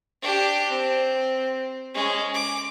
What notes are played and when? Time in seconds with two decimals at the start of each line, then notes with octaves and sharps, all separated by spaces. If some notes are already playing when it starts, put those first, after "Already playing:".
0.22 D4 G4
0.69 C4
1.94 G#3 C#4
2.34 D6